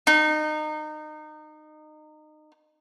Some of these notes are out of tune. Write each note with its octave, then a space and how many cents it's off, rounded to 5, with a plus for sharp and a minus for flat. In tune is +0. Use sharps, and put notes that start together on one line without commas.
D#4 -25